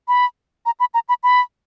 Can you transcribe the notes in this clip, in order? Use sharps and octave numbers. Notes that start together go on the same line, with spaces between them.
B5
A#5
B5
A#5
B5
B5